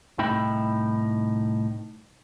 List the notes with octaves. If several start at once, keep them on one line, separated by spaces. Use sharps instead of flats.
C2 A2 D#4 E5 G5 B5